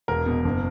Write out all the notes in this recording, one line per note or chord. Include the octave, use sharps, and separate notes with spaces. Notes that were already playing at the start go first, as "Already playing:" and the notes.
E1 A#4
B2
F#1